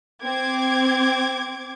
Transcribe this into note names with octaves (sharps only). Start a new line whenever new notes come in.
C4 D6 G#6